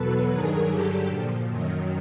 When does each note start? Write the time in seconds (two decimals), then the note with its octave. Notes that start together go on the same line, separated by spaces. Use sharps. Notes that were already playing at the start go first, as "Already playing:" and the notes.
Already playing: E2 B2 F#3 A4 B4
0.28 G2 D#3 F#3 G#4 A#4
0.68 G2 D3 F#3 G4 A4
1.07 A#2 F3
1.47 F#2 D#3 F#3